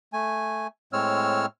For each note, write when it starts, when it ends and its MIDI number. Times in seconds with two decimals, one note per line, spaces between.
0.13 0.67 57
0.13 0.67 80
0.93 1.46 45
0.93 1.46 56
0.93 1.46 60
0.93 1.46 73
0.93 1.46 88
0.93 1.46 89